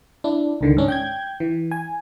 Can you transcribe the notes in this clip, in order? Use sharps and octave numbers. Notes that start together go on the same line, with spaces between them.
D4 E4
C#2 D3 D#3
G#2 C#4 D4
G5 G6 G#6
E3
G#5